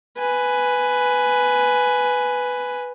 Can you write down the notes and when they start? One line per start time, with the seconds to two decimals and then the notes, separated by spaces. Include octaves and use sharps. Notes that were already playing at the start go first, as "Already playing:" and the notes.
0.18 B4 G#5